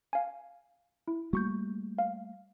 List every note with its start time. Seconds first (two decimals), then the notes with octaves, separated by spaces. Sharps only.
0.13 F5 G#5
1.08 E4
1.33 G3 A3 A#3 F#4 C#6 G6
1.98 F5